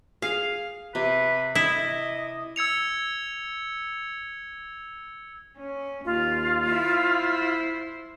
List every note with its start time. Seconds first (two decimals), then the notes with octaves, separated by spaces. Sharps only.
0.22 G#4 F5
0.95 C3 B4
1.55 E4 D#5
2.56 E6 G#6 C#7 F7
5.58 C#4
6.05 D#2 F4
6.67 E4 C5